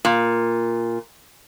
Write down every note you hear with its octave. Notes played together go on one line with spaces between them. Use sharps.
A#2